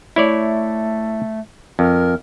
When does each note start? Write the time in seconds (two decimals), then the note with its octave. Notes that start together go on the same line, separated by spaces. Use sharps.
0.16 A3 E4 C#5 D5
1.79 F2 A#4